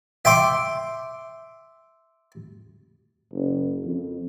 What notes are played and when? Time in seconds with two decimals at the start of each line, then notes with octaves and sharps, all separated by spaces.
0.25 E5 G5 C6 D6
3.32 F#1
3.85 F2